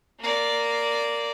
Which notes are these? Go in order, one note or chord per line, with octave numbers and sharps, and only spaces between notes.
A#3 D5